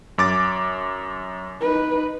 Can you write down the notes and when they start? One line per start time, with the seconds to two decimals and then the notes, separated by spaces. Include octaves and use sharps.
0.18 F#2 D6 A6
1.61 D#4 B4